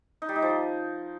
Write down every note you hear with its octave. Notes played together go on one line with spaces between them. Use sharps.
D#4
G3
D#4
F3